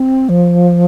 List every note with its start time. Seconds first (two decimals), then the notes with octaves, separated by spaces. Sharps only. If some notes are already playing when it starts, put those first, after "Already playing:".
Already playing: C4
0.29 F3